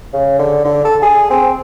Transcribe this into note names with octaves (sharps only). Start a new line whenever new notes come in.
C#3
D3
D3
A4
G#4
C4